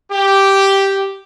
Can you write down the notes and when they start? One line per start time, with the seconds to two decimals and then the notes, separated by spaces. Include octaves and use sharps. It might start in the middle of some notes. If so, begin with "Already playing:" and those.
0.11 G4